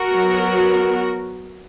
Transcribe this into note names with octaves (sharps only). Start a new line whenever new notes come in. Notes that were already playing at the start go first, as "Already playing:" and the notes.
Already playing: F#4 A#4
F#3 B3